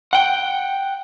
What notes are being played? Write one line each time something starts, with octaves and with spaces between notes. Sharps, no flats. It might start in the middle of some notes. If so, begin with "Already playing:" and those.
F#5 G5